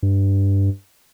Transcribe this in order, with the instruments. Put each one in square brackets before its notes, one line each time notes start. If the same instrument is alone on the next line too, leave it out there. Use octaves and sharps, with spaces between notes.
[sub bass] G2